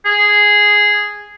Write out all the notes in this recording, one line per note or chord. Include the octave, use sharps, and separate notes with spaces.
G#4